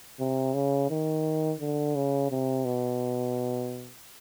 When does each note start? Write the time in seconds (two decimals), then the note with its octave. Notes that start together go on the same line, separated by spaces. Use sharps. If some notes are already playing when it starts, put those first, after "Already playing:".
0.20 C3
0.54 C#3
0.90 D#3
1.60 D3
1.95 C#3
2.31 C3
2.65 B2